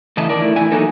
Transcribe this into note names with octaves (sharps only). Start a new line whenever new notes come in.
A2 C#3 E3 A3 D#5 A5
D#3 A#4 D5
A3 E4
A2 E3 E4 G#5
E3 F#3 A#3 D#4 A4 A#4